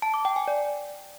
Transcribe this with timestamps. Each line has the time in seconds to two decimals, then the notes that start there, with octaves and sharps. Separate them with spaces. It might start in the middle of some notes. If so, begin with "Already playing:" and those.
0.02 A5
0.14 D6
0.25 G5
0.36 G#5
0.48 D5